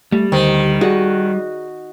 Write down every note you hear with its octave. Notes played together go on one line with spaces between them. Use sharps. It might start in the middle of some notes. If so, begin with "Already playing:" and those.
G3 A3
D2 D#3 C5
F#4 G#4 D5 D#5